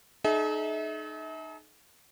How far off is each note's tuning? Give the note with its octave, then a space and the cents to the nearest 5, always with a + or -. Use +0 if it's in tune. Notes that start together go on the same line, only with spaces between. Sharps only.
D#4 -25 G#4 +45 E5 -35